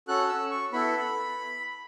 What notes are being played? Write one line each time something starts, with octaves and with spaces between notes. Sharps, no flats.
C#4 F#4 A4 F#6
E6
C#6
B3 E4 A4 B5